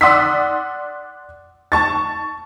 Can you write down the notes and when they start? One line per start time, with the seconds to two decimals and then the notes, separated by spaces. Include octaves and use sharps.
0.01 D5 F#5 C6 D#6 E6 B6
1.72 A5 C#6 A6